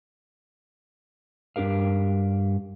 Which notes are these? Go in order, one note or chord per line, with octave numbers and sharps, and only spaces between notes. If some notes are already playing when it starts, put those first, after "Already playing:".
G2 D4 G4 A#4 F5